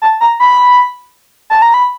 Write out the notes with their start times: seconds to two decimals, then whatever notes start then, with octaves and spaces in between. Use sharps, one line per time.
0.02 A5
0.21 A#5
0.40 B5
1.50 A5
1.62 A#5
1.74 B5